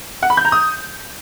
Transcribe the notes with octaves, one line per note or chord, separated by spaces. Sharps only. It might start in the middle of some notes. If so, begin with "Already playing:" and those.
F#5
B5
G6
A#5
D#6